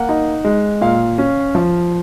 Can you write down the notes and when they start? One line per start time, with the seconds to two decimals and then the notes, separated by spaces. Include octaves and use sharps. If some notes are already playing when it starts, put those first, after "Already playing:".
Already playing: A#3 F#5
0.09 D#4
0.44 G#3
0.81 A#2 F5
1.18 C#4
1.55 F3